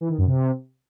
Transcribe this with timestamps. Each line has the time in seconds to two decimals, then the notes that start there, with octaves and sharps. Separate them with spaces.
0.01 E3
0.09 D#3
0.18 F#2
0.27 C3